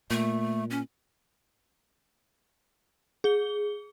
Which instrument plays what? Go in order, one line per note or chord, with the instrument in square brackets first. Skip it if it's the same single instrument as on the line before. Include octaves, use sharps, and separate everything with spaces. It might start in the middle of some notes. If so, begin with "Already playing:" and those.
[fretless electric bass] A#2 [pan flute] A3
[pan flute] C#4
[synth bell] G#4 G7